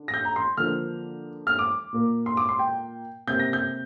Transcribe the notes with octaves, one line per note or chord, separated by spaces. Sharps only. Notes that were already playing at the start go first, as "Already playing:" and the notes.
Already playing: D3
A#6
G6
A#5
C6
D3 F3 A#3 F6
F6
D6
A#2 A#3
C6
D6
C6
G5
C3 A#3 G6
A#6
G6